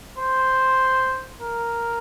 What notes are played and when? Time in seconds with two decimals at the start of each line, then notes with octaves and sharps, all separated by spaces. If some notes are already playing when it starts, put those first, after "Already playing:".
0.18 C5
1.41 A#4